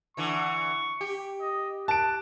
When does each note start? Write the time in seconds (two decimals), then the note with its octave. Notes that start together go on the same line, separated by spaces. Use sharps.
0.17 D3 E3 C#6
1.01 G4
1.41 D#5
1.88 A5 F#6 D7